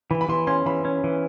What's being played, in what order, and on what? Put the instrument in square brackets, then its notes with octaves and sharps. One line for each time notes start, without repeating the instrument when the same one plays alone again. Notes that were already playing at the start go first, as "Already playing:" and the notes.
[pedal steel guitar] E3 [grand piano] B5
[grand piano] B5
[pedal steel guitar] E3 [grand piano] C6
[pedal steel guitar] C#4 [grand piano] C6
[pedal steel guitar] E3 [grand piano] B5
[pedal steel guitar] C#4
E3